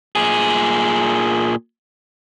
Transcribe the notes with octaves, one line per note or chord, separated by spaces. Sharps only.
A#2 G#4